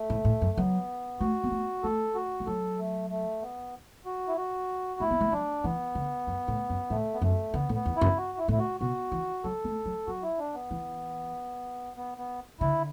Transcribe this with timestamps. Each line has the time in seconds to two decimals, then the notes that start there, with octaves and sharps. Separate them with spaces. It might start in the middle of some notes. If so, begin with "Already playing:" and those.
Already playing: A3
0.10 A2
0.25 A2
0.41 F#2
0.57 F#3 B3
1.20 A3 F#4
1.44 B3
1.51 A3
1.84 A3 A4
2.15 F#4
2.40 A3
2.47 F#3 A4
2.79 A3
3.10 A3
3.42 B3
4.06 F#4
4.28 E4
4.37 F#4
5.00 A3 E4
5.11 B3
5.21 A3
5.32 F#3 D4
5.64 E3 B3
5.95 D3
6.27 F#2
6.48 A2
6.70 F#2
6.90 A2 A3
7.14 B3
7.22 F#2 A3
7.53 D3 B3
7.69 A2
7.75 B3
7.85 E2
7.96 E4
8.01 F#2
8.17 F#4
8.38 E4
8.48 A2 E4
8.59 F#4
8.81 B2 F#4
9.12 E3
9.44 F#3 A4
9.64 A3
9.86 F#3
10.07 F#3 F#4
10.23 E4
10.39 D4
10.55 B3
10.71 E3
11.97 B3
12.18 B3
12.60 D3 E4